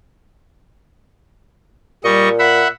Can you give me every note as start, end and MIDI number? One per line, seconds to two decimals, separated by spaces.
2.04 2.66 46
2.04 2.29 55
2.04 2.29 75
2.04 2.29 85
2.39 2.68 76
2.39 2.68 78
2.39 2.68 83